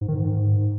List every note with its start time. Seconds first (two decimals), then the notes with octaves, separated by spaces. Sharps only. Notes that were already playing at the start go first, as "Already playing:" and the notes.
0.01 G#2
0.08 D#3
0.15 G#2